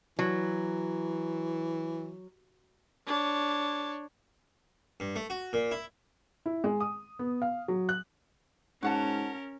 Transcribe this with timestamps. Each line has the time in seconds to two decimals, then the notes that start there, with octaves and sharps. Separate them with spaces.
0.19 E3 F#3
3.07 D4 C#5
5.00 G2
5.16 A3
5.30 F#4
5.53 A#2
5.71 E4
6.46 E4
6.64 G#3
6.80 D#6
7.19 B3
7.42 F5
7.68 F#3
7.89 F#6
8.83 G#2 C#4 F#4 A#4 F#5 A5